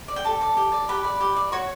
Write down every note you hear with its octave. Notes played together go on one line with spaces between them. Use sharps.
D5
G5
G4 A4 A5
D5
G4
D5
G4 B4 B5
D5
G4
D5
F#4 C#5 C#6